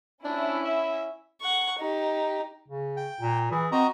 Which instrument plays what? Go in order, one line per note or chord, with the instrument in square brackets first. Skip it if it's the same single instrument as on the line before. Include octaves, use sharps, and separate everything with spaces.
[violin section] C#4 E4 [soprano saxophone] D4
[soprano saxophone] E5
[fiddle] F#5 C#6
D#4 G4
[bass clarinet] C#3
[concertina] G5
[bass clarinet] A#2
[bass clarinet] E3 [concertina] G#4
[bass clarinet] C4 [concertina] F#4 D#5 A#5